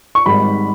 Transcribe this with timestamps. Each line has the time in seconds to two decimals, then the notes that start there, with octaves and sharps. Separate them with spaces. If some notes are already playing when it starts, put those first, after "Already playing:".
0.15 C#6
0.26 G#1 G#2 G3 B5